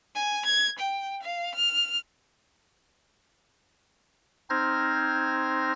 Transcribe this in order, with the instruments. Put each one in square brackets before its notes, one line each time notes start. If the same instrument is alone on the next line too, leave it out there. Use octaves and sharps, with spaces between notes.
[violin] G#5
G#6
G5
F5
F6
[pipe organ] C4 D#4 C5 F6 G#6 A#6